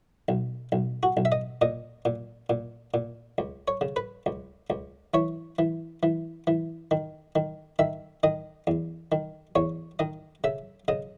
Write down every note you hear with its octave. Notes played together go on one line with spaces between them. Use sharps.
B1
B1
F#4
B1
E5
D#5
A#2 D#5
A#2
A#2
A#2
C#2
C#5
C#3
B4
C#2
C#2
E3 C#5
E3
E3
E3
D#3
D#3
D#3 E5
D#3 D#5
E2
D#3
E2 C#5
D#3 D#5
C#3 E5
C#3 D#5